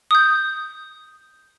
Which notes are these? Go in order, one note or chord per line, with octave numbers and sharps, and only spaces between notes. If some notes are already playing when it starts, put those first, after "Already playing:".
D#6 G6